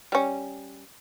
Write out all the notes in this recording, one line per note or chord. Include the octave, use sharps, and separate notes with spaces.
G3 C#4